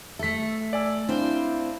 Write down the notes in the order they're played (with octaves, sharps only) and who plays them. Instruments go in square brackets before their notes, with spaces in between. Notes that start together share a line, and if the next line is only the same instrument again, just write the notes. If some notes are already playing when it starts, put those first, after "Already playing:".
[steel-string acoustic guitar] A3 A4 [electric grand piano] E5 B6
[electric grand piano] D5 G#5 E6
[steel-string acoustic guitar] C4 C5 F5 [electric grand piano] D4 [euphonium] E4